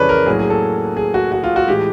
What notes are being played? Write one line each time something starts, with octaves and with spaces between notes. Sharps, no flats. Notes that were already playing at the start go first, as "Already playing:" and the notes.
Already playing: F2 C#3 E3 G#3 A4 B4 C#5 D5
A#4
A2 F#3 A#3 G#4
G#4
A4
G#4
F#4
F#4
F4
F#4
A2 E3 G#3 G4